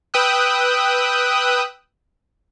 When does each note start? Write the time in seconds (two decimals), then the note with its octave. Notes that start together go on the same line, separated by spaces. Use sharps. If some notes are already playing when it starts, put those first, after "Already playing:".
0.14 B4 G5 D#6 E6 F#6